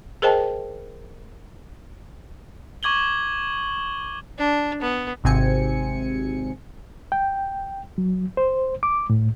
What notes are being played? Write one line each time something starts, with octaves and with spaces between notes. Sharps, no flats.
G#4 A#4 C5 D#5 G5 A5
C#6 D6 G#6 F#7 G7
D4
B3
G#1 C3 C4 G#5 C#7
G5
F#3
C5
D6
A2